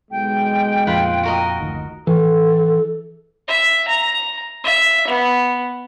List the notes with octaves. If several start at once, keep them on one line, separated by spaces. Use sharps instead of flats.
B1 G#3 G5
F2 A#2 F4 B4
F#4 A#4 D#5
F#1 D2 D#3
E3 A4
E5
A#5
E5
B3